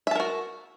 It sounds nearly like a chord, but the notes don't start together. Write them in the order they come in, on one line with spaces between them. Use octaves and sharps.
E5 A5 A#4 F#4